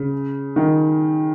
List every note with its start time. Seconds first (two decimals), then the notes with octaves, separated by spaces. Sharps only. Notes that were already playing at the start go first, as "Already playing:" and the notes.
Already playing: C#3
0.56 D#3